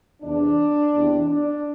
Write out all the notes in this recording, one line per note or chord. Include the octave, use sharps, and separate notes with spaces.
E2 C3 E3 D4
E2 C3 E3
D4